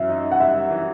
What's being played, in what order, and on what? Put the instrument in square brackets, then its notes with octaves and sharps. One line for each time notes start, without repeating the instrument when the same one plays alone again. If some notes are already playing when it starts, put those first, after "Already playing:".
Already playing: [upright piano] F#2 E3 [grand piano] E5
[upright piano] D#4
[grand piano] F#5
[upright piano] G3 [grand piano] E5
[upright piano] E3